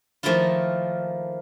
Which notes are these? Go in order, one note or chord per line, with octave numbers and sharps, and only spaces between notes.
D#3 F3 A3 A#3 E4 F4